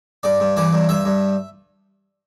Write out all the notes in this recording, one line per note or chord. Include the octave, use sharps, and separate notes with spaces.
G2 D5
G2
E3 D5
G2
G2 E5
G2